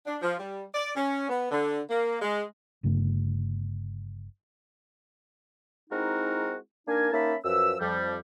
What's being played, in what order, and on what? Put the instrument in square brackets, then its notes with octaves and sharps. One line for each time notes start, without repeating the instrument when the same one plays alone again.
[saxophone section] D4
F3
G3
D5
C#4
B3
D3
A#3
G#3
[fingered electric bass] G1 G2 C#3 A3
[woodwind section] G#3 C4 D#4 E4 F#4 A#4
A#3 D4 D#4 A#4 G#5
A#3 C#4 D#4 E5 A5 B5
F#2 F3 B4 E6
F2 F3 G3